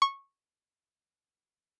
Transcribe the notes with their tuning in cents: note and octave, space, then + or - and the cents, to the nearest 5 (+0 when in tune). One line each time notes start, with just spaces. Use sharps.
C#6 -15